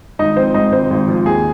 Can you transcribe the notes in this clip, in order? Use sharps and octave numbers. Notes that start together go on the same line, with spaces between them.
G#1 D#4 D#5
F3 C4 C5
G#2 D#4 D#5
G#1 C4 C5
G#1
F3
D#2 G#4